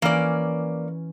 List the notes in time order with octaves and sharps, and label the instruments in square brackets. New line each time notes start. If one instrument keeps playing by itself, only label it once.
[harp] E3 C#4 F6 [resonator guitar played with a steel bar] A#3 D5